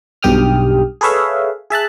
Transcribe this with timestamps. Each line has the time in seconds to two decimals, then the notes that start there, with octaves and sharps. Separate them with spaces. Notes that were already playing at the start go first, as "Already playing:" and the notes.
0.23 B1 G2 G4 G5 D#6 F6
1.01 G#4 A4 B4 C#5 E5 F5
1.70 G#4 E5 A5 F#6